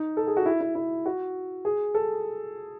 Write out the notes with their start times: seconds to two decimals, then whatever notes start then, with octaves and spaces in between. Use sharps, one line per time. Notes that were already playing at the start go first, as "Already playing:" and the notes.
Already playing: D#4
0.17 A4
0.27 G#4
0.37 F#4
0.46 E4
0.61 E4
0.75 E4
1.06 F#4
1.65 G#4
1.95 A4